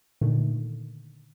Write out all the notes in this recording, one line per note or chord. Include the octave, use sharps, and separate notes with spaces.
A#2 D3 D#3 A3